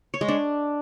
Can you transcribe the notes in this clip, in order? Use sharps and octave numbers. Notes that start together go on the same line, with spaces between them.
C#5
G#3
D4